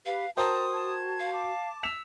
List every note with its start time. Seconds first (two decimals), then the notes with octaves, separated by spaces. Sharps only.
0.06 G4 B4 F5
0.37 F#4 A#4 C5 G5 A5 A#5 D#6
0.74 A5 G#6
1.20 F5
1.33 A5 D6
1.83 E6 B6 E7 F7